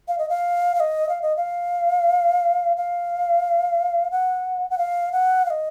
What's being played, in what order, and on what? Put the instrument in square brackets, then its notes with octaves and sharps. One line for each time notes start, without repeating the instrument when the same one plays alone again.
[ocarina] F5
D#5
F5
F5
D#5
F5
D#5
F5
F5
F#5
F#5
F5
F#5
F5
D#5